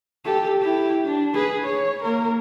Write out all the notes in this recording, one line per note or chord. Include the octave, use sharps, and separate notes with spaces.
G4 A4
E4 G4
D4
G#4 B4
C#5
A#3 A#4